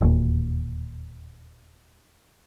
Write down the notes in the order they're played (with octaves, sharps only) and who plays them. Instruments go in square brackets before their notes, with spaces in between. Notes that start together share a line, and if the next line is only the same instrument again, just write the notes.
[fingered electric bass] E1 D#2 A#2